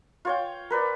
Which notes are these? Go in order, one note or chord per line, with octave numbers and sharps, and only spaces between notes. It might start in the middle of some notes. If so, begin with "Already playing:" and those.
F4 C#5 G5
A#4 B4 D5